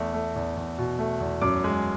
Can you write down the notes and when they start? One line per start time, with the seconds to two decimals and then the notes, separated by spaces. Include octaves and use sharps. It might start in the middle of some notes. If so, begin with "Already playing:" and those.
Already playing: E2 A3
0.14 A3
0.36 E2
0.57 E2
0.78 B2
0.99 A3
1.20 E2
1.42 F#2 D6
1.64 G#3